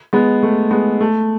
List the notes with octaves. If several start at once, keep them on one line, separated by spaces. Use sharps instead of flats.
G#3 B3
A3
G#3 B3
A3